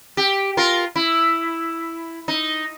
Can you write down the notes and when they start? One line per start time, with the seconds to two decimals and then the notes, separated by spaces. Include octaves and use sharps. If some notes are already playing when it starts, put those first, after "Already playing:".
0.17 G4
0.57 F4 A#4
0.96 E4
2.28 D#4